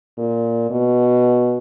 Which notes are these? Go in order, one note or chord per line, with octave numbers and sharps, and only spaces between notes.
A#2
B2